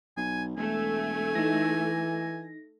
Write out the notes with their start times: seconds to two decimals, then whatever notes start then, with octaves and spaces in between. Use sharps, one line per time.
0.17 B1 G#5
0.57 E1 A3 G#5
1.35 E3 D#4 A#6